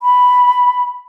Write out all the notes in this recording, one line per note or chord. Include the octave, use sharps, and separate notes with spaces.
B5